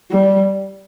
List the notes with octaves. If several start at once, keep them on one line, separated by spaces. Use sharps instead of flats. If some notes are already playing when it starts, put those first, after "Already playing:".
G3